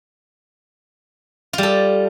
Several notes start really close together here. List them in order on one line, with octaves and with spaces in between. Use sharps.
F4 G3 A4